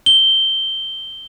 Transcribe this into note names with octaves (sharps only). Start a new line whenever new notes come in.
G7